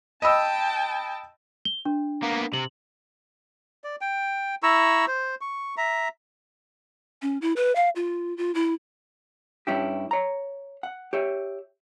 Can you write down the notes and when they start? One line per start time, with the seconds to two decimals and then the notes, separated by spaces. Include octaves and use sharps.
0.22 D#5 G5 A5 B5 E6
1.65 G7
1.85 D4
2.23 A#3 B3
2.53 C3 F#7
3.84 D5
4.01 G5
4.63 E4 A#5 C#6 E6
5.08 C5
5.41 C#6
5.77 E5 A#5
7.22 C#4
7.42 E4
7.56 B4
7.75 F5
7.96 F4
8.37 F4
8.55 E4
9.67 G2 C#4 E4 G4
10.11 C#5 A#5
10.83 F#5
11.13 G4 C#5 E5